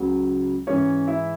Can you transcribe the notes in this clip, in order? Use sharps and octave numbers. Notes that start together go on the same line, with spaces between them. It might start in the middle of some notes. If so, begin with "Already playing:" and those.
Already playing: C#2 C#3 F#3
G#2 E3 G#3 C#4 C#5
E4 E5